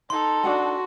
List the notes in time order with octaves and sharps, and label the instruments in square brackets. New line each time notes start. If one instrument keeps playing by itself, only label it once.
[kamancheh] D#4 A4 [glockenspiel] C6
[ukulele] D4 F#5 A5 [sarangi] F#4